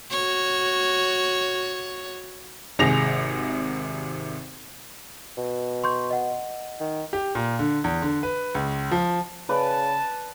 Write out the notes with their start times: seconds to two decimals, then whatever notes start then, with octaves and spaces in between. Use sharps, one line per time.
0.11 F#4 C#5
2.79 G#1 C3 G#4 A#6 F7
5.37 B2
5.84 C6 C#6 G6
6.10 D#5 F#5
6.80 D#3
7.13 G4
7.35 A#2
7.59 D3
7.84 E2
8.02 D3
8.23 B4
8.55 C#2
8.91 F3
9.49 C#3 B4 D5 A5